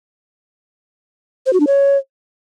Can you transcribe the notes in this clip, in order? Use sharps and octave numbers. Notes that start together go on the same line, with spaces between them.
C5
F#4
D4
C#5